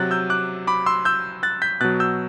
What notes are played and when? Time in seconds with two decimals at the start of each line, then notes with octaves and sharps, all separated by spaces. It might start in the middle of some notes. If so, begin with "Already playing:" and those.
Already playing: C3 F#3 F#6 A6
0.11 E6 G6
0.30 D6 F#6
0.67 B5 D6
0.86 C6 E6
1.05 E6 G6
1.43 F#6 A6
1.62 G6 B6
1.81 B2 F#3 F#6 A6
2.00 E6 G6